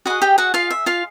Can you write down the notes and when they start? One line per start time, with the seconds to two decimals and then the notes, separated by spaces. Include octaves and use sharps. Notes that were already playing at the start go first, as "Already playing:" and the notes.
0.06 F#4 B4 D#5 F#5
0.10 G#4
0.22 G4 G5
0.38 F#4 F#5
0.54 F4 F5
0.71 E5
0.86 F4 F5